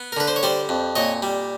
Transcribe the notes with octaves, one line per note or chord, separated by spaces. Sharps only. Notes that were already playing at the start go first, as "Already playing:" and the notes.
Already playing: B3
A#4
D3 B4
C5
C#5
G3 C5 D5
F2
A#2 C#5 D#5
G3